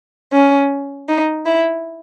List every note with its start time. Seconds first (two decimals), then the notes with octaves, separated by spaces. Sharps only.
0.31 C#4
1.08 D#4
1.45 E4